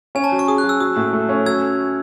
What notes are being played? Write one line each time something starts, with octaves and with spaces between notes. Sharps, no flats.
C#4 G#5
A5
F#3
C#6
G#4 D#6
F#6
F#3
E6
F#3 D#6
A2
A3
C#4
F#3 E6 G#6